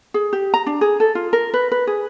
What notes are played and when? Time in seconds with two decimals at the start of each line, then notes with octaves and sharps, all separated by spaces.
0.14 G#4
0.33 G4
0.54 A#5
0.66 D4
0.81 G#4
1.00 A4
1.15 F4
1.33 A#4
1.54 B4
1.72 B4
1.87 G#4